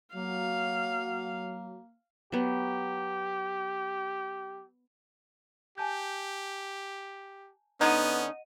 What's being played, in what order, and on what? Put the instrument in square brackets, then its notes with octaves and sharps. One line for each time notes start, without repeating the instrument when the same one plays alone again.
[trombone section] F#3 [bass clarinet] A#3 [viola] F5
[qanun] F#3 B3 [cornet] G4
[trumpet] G4 [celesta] G#5 A5 G6
[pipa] D3 D#4 [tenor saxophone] B3 [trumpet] C#4 [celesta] D#5 F#5 D#7